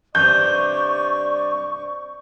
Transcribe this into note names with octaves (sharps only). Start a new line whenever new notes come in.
G2 C3 D5 C#6 G6